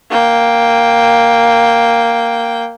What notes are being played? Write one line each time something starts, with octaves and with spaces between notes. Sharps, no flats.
A#3 G5